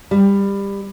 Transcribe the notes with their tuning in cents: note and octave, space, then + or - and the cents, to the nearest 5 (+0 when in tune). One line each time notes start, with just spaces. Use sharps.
G3 +20